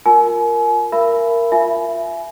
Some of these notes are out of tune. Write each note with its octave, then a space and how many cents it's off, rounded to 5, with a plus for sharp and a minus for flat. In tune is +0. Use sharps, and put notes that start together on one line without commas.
F4 +15 A#4 +0 G#5 +35
A#4 +0 E5 +45 B5 +0
F4 +0 E5 +25 G#5 +25